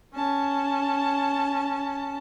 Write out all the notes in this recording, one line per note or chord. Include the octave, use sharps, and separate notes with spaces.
C#4 A5